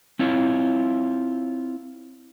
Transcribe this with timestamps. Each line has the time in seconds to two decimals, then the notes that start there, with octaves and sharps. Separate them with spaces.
0.19 C4 E4 F4 C#5